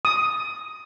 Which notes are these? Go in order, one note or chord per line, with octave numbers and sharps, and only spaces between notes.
D#6